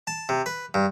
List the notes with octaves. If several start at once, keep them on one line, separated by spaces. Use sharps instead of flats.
A5
C3
B4
G2